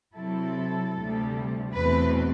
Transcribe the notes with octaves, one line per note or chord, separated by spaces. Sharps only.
C3 F#3 C4 E4 A4
D2 C3 G3
E2 B2 A3 C4 B4